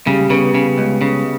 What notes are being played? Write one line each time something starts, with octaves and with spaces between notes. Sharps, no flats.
C#3 G3
C#3 B3
C#3
C#2
C#3